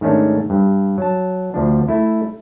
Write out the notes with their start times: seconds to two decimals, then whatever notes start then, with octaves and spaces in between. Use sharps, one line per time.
0.01 G#2 D#3 A3 C#4 D4
0.50 G2
0.98 F#3 A5
1.54 D2 F3 D4
1.88 A3 E4